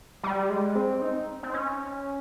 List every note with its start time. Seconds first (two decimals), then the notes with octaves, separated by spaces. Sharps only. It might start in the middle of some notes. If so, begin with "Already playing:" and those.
0.23 G3
0.50 G#3
0.75 C4
1.02 D#4
1.43 C4
1.54 C#4